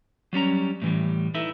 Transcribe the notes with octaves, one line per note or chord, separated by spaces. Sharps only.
F#3 G3 C#4 A#5
A2 E3 G3
D#4 E4 A4 B4 E5